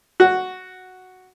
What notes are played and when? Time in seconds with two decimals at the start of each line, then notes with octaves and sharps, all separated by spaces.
0.20 F#4